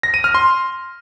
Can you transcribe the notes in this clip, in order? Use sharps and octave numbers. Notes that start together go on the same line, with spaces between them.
A#6
D#7
F6
C6